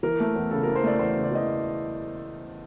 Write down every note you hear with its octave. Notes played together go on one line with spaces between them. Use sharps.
E3 A#4
A3
E2
C#3 A4
A#4
E3
C5
A3 D5
E2 C5
C#3
D5
E3 D#5